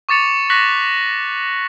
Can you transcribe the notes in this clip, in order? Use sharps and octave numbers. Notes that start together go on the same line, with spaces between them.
C#6 D6 A6 C#7 F7
C#6 F#6 A#6 B6 F#7